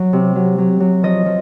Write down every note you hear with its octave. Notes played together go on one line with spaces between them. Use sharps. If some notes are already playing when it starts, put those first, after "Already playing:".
Already playing: F#3
C3
F#3
F#3
F#3
F3 D#5
F3